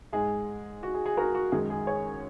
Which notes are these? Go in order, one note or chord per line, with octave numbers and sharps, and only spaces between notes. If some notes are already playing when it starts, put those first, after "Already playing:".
G#2 G#3 G#4
F#4
G#4
G#4
F#4 A#4
F#4
F#2 D#3 G#3 G#4
G#4
G#4 C#5